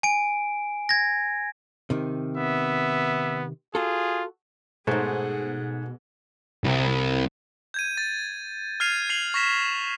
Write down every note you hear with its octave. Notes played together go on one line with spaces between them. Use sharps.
G#5 D7
G#6 A#6
C3 D#3
B3 E5
F4 F#4 G#4 A4
G#2 B2 A3 D#4 G#4 C5 F#5
C2
G6 G#6 D#7
A6
F6 G#6 C7 D#7 F7
G#6 C7 F7 F#7
C#6 A#6 B6 E7